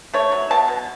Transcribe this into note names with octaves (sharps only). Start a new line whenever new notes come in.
A3 C#5
F#3
B2 A5
B2